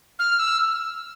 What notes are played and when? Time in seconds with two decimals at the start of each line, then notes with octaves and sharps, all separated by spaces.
0.19 F6
0.39 E6